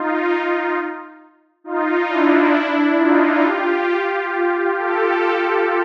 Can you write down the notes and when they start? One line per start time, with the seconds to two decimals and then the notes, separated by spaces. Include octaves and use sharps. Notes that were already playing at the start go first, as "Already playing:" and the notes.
Already playing: D#4 F4
1.64 D#4 F4
2.09 D4 E4
2.98 D#4 F4
3.43 F4 G4
4.78 G4 A4